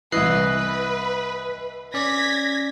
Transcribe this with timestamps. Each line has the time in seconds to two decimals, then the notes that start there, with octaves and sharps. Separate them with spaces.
0.12 C2 E3 B4 D#5 F#6 C7
1.94 C#4 D5 G#6 A#6 B6